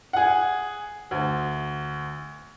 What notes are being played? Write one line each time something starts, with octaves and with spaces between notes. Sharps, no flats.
G#4 F#5
D2